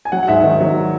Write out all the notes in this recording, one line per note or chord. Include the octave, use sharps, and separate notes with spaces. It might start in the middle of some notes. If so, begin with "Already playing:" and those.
G#5
F#3 F#5
F#5
G#2 E5
D#3
F#3